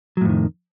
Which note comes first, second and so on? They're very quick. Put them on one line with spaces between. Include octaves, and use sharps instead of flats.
F#3 A2 F2 D#3